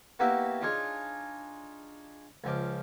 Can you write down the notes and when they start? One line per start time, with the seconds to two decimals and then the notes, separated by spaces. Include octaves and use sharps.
0.19 A#3 B3 E4 F#4 G4 E5
0.62 D4 D#4 F4 G#4 C#5
2.44 C#2 F3 D5